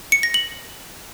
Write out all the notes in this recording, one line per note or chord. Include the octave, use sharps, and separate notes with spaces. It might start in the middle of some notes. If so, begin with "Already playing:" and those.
C#7
A#6
F#7